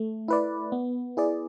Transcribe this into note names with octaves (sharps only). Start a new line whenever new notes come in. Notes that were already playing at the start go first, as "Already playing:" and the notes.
Already playing: A3
E4 B4 D5
B3
E4 G#4 D5